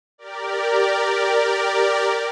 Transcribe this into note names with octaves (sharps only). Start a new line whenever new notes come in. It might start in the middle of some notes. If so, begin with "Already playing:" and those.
G4 A#4 D5